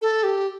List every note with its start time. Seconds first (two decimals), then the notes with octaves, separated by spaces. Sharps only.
0.02 A4
0.23 G4